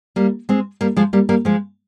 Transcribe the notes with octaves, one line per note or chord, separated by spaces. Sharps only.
G3 A#3
G#3 C4
G3 A#3
F3 G#3
G3 A#3
G3 A#3
F3 G#3